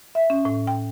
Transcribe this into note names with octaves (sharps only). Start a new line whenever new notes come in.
E5
C#4
A2
G5